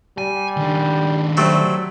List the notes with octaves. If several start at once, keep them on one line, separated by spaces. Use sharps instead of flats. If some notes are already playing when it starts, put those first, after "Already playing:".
G3 G#5
D#3 D4
F#3 G3 A3 C4